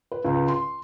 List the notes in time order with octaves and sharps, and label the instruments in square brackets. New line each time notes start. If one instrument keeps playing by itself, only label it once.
[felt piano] B4
C#2
C6